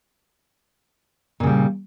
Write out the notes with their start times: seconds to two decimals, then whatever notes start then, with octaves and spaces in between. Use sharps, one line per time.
1.40 A#2
1.43 C#3
1.47 G3